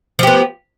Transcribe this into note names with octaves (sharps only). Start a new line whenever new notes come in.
F3 B3 G4